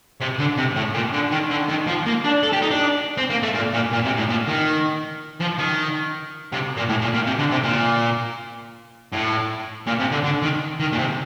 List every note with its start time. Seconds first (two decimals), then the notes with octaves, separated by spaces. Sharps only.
0.20 C3
0.39 D3
0.57 C3
0.76 A2
0.94 A#2
1.13 D3
1.31 D#3
1.50 D3
1.69 D#3
1.87 F3
2.06 A#3
2.25 D4
2.43 A4
2.53 G4
2.62 D#4
2.71 D4
3.17 C4
3.30 A#3
3.43 A3
3.54 A#2
3.73 A#2
3.92 A#2
4.04 C3
4.17 A2
4.29 A#2
4.48 D#3
5.41 F3
5.59 D#3
6.52 C3
6.77 A#2
6.89 A2
7.02 A#2
7.14 A#2
7.26 C3
7.39 D3
7.52 C3
7.64 A#2
9.12 A2
9.87 A#2
9.99 C3
10.11 D3
10.24 D3
10.42 D#3
10.80 D#3
10.92 A#2
10.98 C3